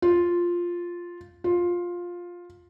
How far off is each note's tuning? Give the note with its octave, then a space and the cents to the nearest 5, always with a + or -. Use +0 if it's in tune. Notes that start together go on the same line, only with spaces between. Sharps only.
F4 +0
F4 +10